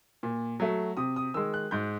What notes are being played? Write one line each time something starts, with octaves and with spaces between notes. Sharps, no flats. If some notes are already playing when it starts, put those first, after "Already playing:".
A#2
F#3 A3
C3 D#6
D#6
D#3 G#3 E6
F#6
G#2 G6